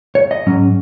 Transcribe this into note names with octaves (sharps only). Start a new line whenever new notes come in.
C#5
D#5
G#2 F#3 C#4